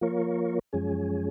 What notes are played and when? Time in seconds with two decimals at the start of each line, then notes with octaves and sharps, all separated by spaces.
0.01 F3 A#3 F4 A#4 C#5
0.73 F#2 F3 G#3 C#4 G#4